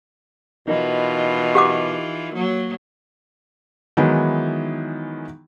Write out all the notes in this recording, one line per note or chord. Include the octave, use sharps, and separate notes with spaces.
B2 E3 D#4 F4 A#4 D#5
G4 F#5 D6
F#3 A#3
D#3 E3 F#3 G#3 B3 E4